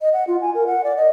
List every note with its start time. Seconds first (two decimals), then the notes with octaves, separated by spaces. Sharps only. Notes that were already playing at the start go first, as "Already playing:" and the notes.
0.01 D#5
0.13 F#5
0.27 F4
0.41 G#5
0.55 A#4
0.67 F#5
0.84 D5
0.97 D#5